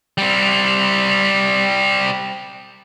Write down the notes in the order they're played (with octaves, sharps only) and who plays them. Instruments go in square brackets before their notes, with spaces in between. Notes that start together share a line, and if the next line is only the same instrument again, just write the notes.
[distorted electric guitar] G3 C4